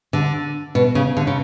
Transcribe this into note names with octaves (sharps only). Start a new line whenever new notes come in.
D3
B2
C#3
D3
C#3